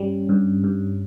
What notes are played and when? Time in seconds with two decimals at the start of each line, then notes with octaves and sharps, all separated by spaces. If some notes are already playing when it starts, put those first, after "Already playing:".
Already playing: G2 G3 C#4
0.29 G2
0.64 G2